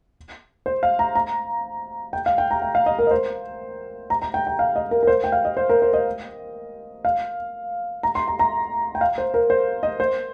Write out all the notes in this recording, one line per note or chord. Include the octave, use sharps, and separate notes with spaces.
C5
F5
A#5
A#5
G5
F5
G5
A#5
G5
F5
D#5
A#4
D#5
C5
A#5
A#5
G5
G5
F5
D#5
A#4
A#4
C5
G5
F5
D#5
C5
A#4
C5
D#5
F5
A#5
C6
A#5
A#5
G5
F5
C5
A#4
C5
D#5
C5